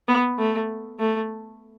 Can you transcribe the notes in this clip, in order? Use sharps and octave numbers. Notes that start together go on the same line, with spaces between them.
B3
A3
A3